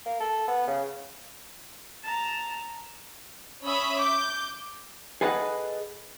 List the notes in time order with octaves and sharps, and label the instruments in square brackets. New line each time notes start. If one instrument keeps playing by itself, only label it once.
[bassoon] A#3
A4
B3
C#3
[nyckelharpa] A5 A#5
[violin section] C#4 E5 B5 D#6
D6 G6
[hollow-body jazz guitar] G#4 A4 B4 D#5 F5 F#5